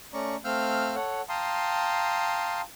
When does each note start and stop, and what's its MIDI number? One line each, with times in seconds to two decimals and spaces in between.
0.13 0.36 57
0.13 0.36 61
0.13 0.36 74
0.13 0.36 82
0.13 0.36 85
0.44 0.95 57
0.44 0.95 60
0.44 0.95 77
0.44 0.95 88
0.44 0.95 89
0.44 0.95 91
0.95 1.21 69
0.95 1.21 73
0.95 1.21 78
1.29 2.61 77
1.29 2.61 79
1.29 2.61 81
1.29 2.61 82
1.29 2.61 84
1.29 2.61 87